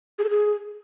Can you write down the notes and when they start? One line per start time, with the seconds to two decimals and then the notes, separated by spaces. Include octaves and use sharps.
0.18 G#4
0.24 A4
0.30 G#4